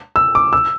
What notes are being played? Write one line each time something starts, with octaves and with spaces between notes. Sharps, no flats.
E6
D6
E6